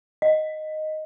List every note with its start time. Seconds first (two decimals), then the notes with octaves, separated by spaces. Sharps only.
0.22 D#5